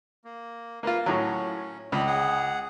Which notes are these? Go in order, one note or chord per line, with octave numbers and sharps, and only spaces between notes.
A#3
A#3 F4 B4
A2 F#3 C#4
C#2 G#3 D4 B5
G#4 F#5